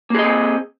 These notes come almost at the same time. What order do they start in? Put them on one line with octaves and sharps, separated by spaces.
A#3 G#4 D#5 C4